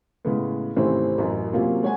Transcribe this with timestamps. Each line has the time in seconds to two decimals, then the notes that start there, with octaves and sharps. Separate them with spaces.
0.25 A2 C#3 G#3 B3
0.76 G#1 C3 E3 A3 C4 C#4
1.18 A1 F#2
1.53 C3 F#3 A#3 C#4 F4
1.83 G#3 C#5 F#5 G#5